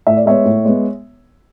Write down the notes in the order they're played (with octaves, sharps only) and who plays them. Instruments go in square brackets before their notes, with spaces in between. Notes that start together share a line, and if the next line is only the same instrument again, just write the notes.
[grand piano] A2 E5
D5
G#3 B3 C#5 E5
A2
G#3 B3